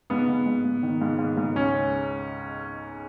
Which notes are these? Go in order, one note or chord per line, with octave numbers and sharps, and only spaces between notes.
G#2 B3
G#2
G#2
G#2
D#3
G#2
G#2
G#2
C#2 C#4